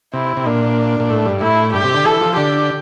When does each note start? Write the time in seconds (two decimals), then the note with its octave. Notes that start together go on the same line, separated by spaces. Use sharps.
0.13 C3 E4
0.37 C3
0.46 A#2 D4
1.00 A#2
1.10 A2
1.26 G2
1.41 A2 E4
1.73 G2 G4
1.84 C3
1.94 D3
2.05 E3 A4
2.21 F3
2.37 D3 G4